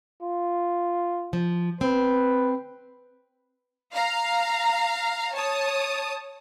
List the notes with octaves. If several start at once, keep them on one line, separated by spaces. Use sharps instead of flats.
F4
F3
C4 B4
F5 A#5
C#5 A5 D#6